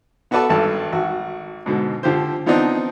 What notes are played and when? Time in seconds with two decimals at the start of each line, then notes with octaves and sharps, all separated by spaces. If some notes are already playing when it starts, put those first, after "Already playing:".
0.31 B3 F#4 A4 B4 D5 A5
0.49 G#1 G2 A4 A5
0.92 G#1 F#4
1.66 G#2 B2 D3
2.03 D3 F3 G4 C5
2.46 F3 B3 C4 D4 D#4